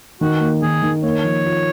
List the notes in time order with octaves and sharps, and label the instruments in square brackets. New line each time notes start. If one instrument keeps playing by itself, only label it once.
[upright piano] D#3 [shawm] F#4
[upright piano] A#3
[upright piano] D#3 [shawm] G#4
[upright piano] D#3
[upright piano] A#3 [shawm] C#5
[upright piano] F3
F4